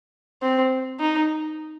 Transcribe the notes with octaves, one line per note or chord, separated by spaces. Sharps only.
C4
D#4